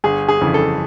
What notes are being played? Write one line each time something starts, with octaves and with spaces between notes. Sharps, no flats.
G1 G#4
G#4
F2 C#3 E3
A4